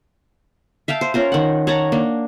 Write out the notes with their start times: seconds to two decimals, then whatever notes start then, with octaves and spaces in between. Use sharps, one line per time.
0.88 E5 F5 G5 A5
1.01 C5
1.14 C#4 F4 A#4 C5
1.32 D#3 F#5
1.67 C#5 F#5 A5 A#5
1.92 A#3 D4